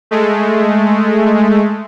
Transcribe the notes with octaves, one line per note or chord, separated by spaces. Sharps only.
G#3 A3